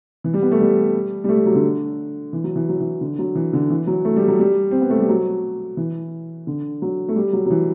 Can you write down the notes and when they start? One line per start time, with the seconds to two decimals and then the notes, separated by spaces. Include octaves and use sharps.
0.24 E3
0.34 G3
0.42 B3
0.51 A3
0.60 G3
1.24 G3
1.29 A3
1.37 G3
1.46 F#3
1.55 D3
2.33 E3
2.44 F#3
2.56 E3
2.69 F#3
2.80 E3
3.01 D3
3.19 F#3
3.35 E3
3.53 D3
3.70 E3
3.87 F#3
4.05 A3
4.16 G3
4.28 F#3
4.39 G3
4.71 C4
4.81 B3
4.90 A3
4.99 G3
5.09 F#3
5.77 E3
6.47 D3
6.82 F#3
7.08 A3
7.16 G3
7.33 F#3
7.46 F#3
7.50 E3